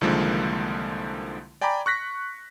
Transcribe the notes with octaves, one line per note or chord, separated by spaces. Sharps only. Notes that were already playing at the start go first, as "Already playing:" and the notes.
C2 D3 D#3 F3 G#3 A#3
D5 G5 G#5 A#5 B5 D6
C#6 F#6 A#6 B6